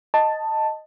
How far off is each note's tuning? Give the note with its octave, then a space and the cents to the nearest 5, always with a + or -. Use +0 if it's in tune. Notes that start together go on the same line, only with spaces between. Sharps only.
D#5 +0 A5 +10